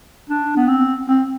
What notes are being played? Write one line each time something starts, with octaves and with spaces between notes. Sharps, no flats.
D4
B3
C4
C4